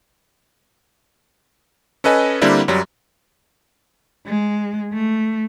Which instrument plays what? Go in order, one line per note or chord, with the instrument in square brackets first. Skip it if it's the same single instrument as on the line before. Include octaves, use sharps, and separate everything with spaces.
[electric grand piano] C#4 A4 B4 D#5 G#5
D3 G3 A#3 C4 D4 E4
F#2 F#3 G3
[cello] G#3
A3